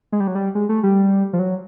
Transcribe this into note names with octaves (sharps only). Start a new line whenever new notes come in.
G#3
G3
F#3
G3
G#3
A3
G3
F3
F#3